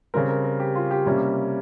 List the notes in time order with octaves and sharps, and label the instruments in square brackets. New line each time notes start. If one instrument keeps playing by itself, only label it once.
[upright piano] C#3 G3 C4 A#4
A#4
A#4
G4
F4
G4
C3 G3 A#3 C#4